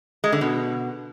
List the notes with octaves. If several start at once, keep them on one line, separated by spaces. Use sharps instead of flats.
G#3
D3
B2